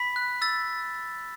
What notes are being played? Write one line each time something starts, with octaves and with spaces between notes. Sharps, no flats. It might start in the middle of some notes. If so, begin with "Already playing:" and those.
Already playing: B5 B6
F#6
E6 A6